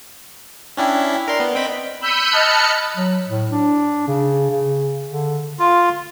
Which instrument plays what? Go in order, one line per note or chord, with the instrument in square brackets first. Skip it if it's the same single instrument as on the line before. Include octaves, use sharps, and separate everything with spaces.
[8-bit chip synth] C#4 D4 E4 [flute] G5
[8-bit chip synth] A#4 C6 [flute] D5
[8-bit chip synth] B3
[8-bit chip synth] C4 G5 B5 [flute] D#5
[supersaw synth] B5 E6 G6 B6 C#7 D#7
D#5 A5 B5 F6 F#6 C#7
[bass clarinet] F#3
A2
D4
C#3
C#3
D3
[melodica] F4